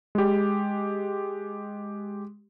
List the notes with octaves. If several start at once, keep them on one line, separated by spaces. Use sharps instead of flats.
G#3 G4